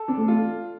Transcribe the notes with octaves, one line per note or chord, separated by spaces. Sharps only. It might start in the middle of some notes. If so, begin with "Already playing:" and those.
Already playing: A4
C4 D4
A3
A3 F4